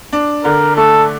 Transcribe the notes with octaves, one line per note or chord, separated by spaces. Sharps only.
D4
D3 A#4
A3 A4